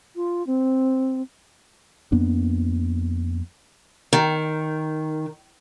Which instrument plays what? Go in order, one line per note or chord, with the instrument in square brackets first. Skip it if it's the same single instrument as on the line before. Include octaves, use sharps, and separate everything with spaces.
[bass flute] F4
C4
[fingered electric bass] F2 A#3 B3 D4
[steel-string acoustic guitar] D#3